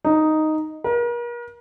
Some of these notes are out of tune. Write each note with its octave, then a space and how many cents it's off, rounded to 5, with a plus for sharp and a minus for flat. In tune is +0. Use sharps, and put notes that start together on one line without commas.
D#4 +0
A#4 +40